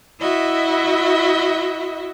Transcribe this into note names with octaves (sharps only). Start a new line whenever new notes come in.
E4 F#4 D#5 E5